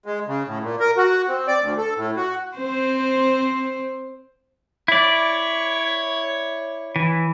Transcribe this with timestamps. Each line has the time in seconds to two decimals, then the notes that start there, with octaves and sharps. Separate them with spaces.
0.06 G#3
0.28 C#3
0.47 A2
0.62 A#2
0.80 A#4
0.97 F#4
1.28 C4
1.48 D5
1.62 D2
1.77 A4
1.96 A2
2.17 F#4
2.57 C4 C5
4.88 E4 C#5 D5
6.96 E3